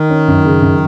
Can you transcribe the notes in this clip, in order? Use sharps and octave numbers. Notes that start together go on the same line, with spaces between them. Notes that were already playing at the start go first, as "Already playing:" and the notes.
Already playing: D#3
C#4
F#2
C#3
F#2